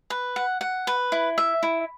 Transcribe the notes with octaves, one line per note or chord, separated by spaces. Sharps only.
B4
F#5
F#5
B4
E4
E5
E4